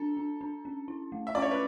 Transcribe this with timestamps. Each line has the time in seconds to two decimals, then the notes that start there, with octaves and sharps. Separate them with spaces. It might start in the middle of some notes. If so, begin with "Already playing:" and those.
Already playing: D4 A4
0.17 D4
0.41 D4
0.65 C#4
0.88 E4
1.12 A3
1.27 E5
1.35 C#4 D5
1.42 C#5
1.51 B4